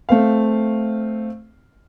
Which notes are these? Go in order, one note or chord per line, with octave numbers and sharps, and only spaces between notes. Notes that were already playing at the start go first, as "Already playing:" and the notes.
A3 C4 F5